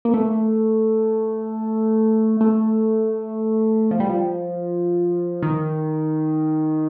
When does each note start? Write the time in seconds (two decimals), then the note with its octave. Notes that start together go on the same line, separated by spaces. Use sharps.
0.05 A#3
0.14 A3
2.41 A3
3.91 F3
4.00 G3
4.09 F3
5.43 D#3